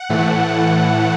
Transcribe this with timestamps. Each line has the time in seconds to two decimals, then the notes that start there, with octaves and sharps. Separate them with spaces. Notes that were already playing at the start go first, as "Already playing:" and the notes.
Already playing: F#5
0.09 A2 E3 A3